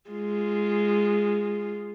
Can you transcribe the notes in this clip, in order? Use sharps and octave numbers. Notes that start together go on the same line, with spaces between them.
G#3 F4